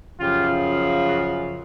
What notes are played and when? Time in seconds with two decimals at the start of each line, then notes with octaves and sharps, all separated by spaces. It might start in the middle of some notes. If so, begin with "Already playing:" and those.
0.19 F#2 C#3 F3 F4 G4
1.06 F#4 G#4